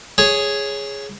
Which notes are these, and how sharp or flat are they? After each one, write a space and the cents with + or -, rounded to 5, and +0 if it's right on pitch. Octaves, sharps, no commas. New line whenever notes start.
G#4 +0 C#5 +0